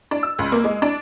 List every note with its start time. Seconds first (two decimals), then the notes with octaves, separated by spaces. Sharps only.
0.11 D4
0.23 E6
0.39 C#2
0.52 A#3
0.64 G#3
0.82 D4